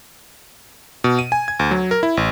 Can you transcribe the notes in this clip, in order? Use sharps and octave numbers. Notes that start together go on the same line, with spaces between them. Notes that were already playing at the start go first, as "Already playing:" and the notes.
B2
D#7
G#5
G#6
D2
F#3
A#4
E4
A1